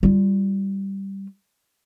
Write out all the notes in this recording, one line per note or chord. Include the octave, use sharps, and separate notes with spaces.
G3 F4